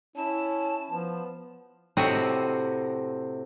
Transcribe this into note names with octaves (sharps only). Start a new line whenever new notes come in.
C#4 E4 A5
F3 B3
A2 C3 C4 F#4 D#5 E5